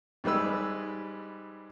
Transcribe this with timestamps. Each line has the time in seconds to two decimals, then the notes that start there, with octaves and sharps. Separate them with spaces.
0.24 G#2 G3 G#3 B4 E6